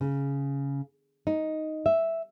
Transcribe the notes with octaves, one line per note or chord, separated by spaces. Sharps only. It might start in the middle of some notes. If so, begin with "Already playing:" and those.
C#3
D#4
E5